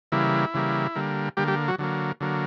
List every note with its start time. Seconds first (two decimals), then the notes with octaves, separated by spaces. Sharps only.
0.12 C#3 E3 G3 A#3 E4
0.54 C#3 E3 G3 A#3
0.95 D3 G3 A#3
1.37 D3 G3 A#3 G4
1.48 G3 G4
1.68 F#3 F#4
1.79 D3 F#3 A#3
2.21 D3 F#3 A#3